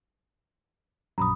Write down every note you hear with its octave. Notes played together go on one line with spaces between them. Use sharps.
A#1 F#2 A#5 B5 D#6